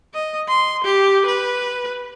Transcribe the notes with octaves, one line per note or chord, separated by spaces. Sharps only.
D#5
C6
G4
B4